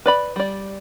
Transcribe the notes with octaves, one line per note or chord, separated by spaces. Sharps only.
B4 D5 B5
G3 D5